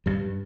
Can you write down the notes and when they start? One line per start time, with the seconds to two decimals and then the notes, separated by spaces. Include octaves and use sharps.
0.06 G2 G3